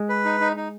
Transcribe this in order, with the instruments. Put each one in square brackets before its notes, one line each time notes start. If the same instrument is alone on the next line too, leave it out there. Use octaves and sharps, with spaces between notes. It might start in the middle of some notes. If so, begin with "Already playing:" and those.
Already playing: [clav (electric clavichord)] G#3
[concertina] B4
D#4
D#4
D#4